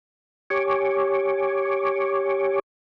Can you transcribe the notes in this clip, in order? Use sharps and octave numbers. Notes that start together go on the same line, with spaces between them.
G4 C#5 G#5 C#6 D6